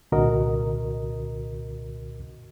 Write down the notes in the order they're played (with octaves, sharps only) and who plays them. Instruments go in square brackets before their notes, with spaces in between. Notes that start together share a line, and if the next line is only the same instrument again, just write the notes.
[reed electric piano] C2 A#2 D3 F#4 A#4 D#5